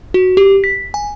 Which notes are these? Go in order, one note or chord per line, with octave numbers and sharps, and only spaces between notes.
F#4
G4
B6
G#5